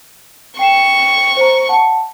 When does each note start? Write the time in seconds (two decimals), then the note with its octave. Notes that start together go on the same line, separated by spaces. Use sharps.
0.59 G5 C#6 C7 E7
1.37 C5 A#5
1.69 F#5 A5